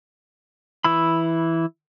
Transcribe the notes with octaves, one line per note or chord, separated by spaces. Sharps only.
E3 E4 B5